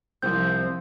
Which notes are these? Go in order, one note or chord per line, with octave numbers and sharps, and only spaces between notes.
C2 F3 C4 G6